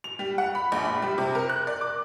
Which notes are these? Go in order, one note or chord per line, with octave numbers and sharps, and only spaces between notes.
F7
G3
F#5
B5
A#1
B5
G3
C3
A#4
F#6
D5
D6